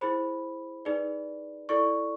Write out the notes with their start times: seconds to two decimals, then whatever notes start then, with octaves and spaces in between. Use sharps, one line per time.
0.01 E4 G#4 C5 B5
0.85 D#4 G#4 B4 D5
1.69 E4 A4 D5 C#6